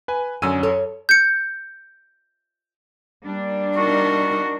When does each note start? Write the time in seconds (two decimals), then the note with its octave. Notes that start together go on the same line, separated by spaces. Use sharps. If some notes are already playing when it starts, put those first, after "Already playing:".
0.08 B4 G#5
0.42 F#2 D3 C#4 G#5 E6 D#7
0.63 A4 C#5
1.09 G6 C#7
3.25 G3 A#3 D4
3.77 D#4 F#4 A#4